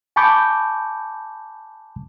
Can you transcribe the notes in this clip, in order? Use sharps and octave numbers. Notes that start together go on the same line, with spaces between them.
G#5 A5 B5 C#6 D6 G6